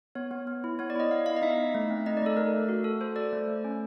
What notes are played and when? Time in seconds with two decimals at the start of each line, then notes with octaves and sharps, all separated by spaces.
0.15 B3 C#5
0.31 B3
0.47 B3
0.64 E4
0.79 B3 C#5
0.90 D5
0.96 E4 D#5
1.11 B3 F5
1.26 E4 F5
1.36 D#5
1.42 D#4 E5
1.58 D#4
1.75 A3
1.90 C4
2.06 D#4 D#5
2.17 D5
2.22 A3 A4
2.37 A3 A#4
2.54 A3
2.69 F#4
2.84 A4
3.01 A4 C5
3.16 A4 D5
3.33 A3
3.47 A3
3.64 C#4